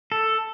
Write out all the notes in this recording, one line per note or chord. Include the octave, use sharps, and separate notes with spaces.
A4